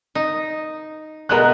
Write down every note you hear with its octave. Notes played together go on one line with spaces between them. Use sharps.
D#4
B2 G#3 A3 A#4 F#6